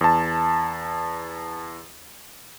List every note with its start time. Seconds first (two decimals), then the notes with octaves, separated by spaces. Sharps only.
0.01 E2 A5